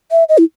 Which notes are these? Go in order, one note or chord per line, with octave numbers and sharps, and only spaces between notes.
E5
D#5
E4